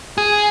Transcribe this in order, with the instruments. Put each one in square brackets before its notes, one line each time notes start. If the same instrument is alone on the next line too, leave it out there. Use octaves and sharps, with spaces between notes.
[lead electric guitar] G#4